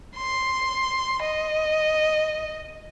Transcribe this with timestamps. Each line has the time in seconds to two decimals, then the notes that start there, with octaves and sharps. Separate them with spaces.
0.16 C6
1.23 D#5